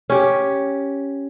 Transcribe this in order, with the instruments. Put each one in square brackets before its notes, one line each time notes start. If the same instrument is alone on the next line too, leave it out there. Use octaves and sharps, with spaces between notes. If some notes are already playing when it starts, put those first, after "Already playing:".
[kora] C#4 G4